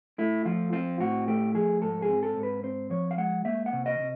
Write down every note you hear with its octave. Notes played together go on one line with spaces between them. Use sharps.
A3 E4
F3 F4
C4 F4
A2 F#4
A3 G4
F3 G#4
G#2 A4
G#4
C4
A4
G#2
B4
C4 C5
F3 C#5
F5
G#3 F#5
A#3 E5
F#5
C3
D#5
C3